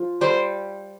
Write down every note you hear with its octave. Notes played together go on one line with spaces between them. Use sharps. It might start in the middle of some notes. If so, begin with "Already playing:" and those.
Already playing: F3 F4
G3 G4 C5